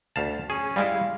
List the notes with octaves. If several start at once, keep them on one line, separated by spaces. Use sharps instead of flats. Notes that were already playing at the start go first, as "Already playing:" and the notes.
D2 F5 A5
C#4 G#4
G3 G#3 E4 F5